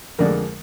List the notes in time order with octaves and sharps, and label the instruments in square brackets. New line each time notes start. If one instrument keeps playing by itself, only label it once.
[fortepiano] F2 D3 G#3 A#4